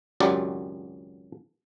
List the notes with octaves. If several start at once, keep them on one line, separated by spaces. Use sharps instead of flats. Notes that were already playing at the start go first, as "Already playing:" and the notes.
G#1 C#2 F#2 F#3 G4 D5